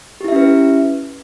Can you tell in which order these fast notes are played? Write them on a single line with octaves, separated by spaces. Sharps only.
G4 E4 E5 C#4 B4